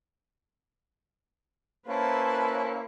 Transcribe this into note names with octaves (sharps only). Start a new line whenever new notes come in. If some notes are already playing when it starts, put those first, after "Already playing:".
A#3 C#4 E4 B4 C5 A5